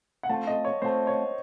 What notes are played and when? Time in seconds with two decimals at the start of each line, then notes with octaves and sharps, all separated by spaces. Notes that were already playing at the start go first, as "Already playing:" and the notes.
0.23 F#5
0.29 A3 C4 F4 A4 A5
0.47 D#5
0.65 C#5
0.82 A3 C4 F4 A4 C5
1.07 C#5